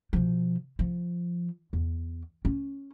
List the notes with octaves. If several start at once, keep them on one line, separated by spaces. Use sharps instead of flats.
B2 F3
F3
E2
C#4